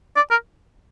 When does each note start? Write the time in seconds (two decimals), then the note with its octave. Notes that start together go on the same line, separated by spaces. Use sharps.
0.16 D5
0.31 A#4